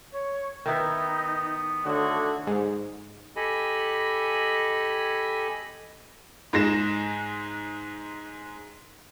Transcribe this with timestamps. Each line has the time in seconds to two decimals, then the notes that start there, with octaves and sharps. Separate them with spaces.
0.12 C#5
0.66 D#3 B3 D#4 E4 B4
1.86 D3 A3 F#4 C#5 D#5
2.47 G#2
3.36 G4 A4 D#5 G#5 B5
6.53 G#2 G#3 A#6 E7